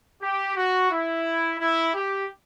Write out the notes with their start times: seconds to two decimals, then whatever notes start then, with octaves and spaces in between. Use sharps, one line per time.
0.22 G4
0.56 F#4
0.91 E4
1.59 E4
1.94 G4